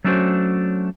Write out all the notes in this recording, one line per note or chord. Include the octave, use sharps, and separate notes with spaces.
F#3 A3 C#4 D4 F#4 C5